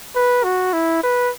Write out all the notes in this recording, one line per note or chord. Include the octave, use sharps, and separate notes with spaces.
B4
F#4
E4
B4